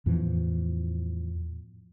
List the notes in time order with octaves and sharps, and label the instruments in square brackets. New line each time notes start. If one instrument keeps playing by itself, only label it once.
[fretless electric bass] E2 A2 E3 F3